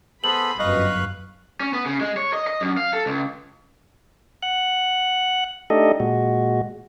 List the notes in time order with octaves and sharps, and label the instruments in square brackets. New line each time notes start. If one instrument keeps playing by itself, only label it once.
[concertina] B3 A4 C5 [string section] G#4 B5 [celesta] F#7
[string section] G1 F#2 B4 [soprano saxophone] D#5 [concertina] F5 C#6 F#6
[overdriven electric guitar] C#4
B3
C#3
G#3
C#5
D#5
D#5
F#2
F5
A4
C#2
[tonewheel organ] F#5 F#6
A3 D4 D#4 G4 A4 D#5
A#2 G#3 F#4